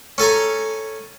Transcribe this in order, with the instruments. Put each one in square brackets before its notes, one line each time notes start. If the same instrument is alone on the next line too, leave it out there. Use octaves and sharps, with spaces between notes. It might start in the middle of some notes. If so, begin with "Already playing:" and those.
[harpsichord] C#4 A4 G#5 A#5